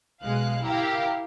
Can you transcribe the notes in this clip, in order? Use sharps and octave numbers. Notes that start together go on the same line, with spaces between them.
B1 G#3 F5 F#6
E4 G4 A#4 F5